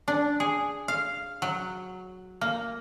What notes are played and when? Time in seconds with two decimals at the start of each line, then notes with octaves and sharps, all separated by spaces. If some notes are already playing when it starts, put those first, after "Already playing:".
0.08 D4
0.40 G#4
0.88 F5
1.42 F#3
2.41 A#3